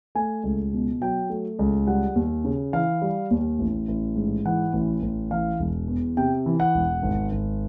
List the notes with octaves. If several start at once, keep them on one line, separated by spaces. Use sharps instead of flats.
A3 G#5
C#2
B2
F#3 G5
A3
C#2
G3 F#5
D#2
C#3
E3 F5
G3
D#2
A1
A1
G#2
E3 F#5
A1
A1
E3 F5
E1
E2
C3 G5
E3
F#5
E1
G#1
G#1